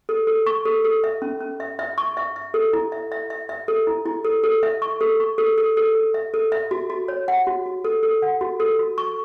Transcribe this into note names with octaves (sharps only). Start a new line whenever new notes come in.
A4
A4
C#6
A4
A4
E5
C#4
C#4
E5
E5
C#6
E5
E5
A4
E4
E5
E5
E5
E5
A4
E4
E4
A4
A4
E5
C#6
A4
C#6
A4
A4
A4
A4
E5
A4
E5
F#4
F#4
C#5
F#5
F#4
F#4
A4
A4
F#5
F#4
A4
F#4
C#6